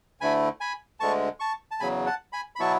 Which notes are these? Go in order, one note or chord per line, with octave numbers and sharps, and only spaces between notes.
D2 D3 A3 E4 G#5 B5
G#5 B5
D2 D3 G#3 A5 C#6
A5 C#6
A5
E2 C#3 F#3 G#5 B5
F#5 A5
G#5 B5
B5
B2 F#3 B3 E4 A5 C#6